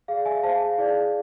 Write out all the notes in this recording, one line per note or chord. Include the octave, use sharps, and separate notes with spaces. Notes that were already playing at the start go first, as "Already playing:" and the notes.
G#4 D5 F5
E5 G#5
G#4 C5 F5 A5
E4 G#4 D5